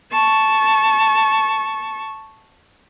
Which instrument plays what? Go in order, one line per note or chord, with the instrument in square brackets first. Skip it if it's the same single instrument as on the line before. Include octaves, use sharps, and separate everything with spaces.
[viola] A5 C#6